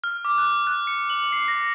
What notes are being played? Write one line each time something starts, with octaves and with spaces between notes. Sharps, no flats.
F6
D6
F#6
F#6
C#7
F#7
C7
A#6